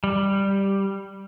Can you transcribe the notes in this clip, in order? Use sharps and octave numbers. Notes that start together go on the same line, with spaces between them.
G3